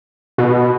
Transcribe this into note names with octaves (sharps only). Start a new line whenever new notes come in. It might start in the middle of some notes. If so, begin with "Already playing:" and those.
B2